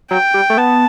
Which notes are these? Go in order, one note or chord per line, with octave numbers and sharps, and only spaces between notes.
F#3 G5
G3
A3
B3 A5